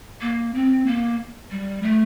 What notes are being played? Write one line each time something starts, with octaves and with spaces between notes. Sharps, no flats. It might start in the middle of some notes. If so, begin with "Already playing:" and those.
A#3
C4
A#3
G3
A3